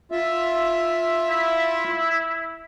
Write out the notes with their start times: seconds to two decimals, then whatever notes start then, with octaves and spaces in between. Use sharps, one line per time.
0.12 F4 E5
1.29 E4